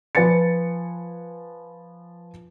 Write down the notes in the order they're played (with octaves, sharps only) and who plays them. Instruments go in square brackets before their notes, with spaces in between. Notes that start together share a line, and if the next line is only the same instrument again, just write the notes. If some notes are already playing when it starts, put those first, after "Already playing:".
[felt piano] F3 B4 G#5 A6 C#7